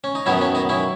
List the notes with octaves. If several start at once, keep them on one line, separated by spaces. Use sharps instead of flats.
C#4
D#4
F#2 D#3 F#3 B3 C#4 E4
C#4
B3 D#4
C#4 E4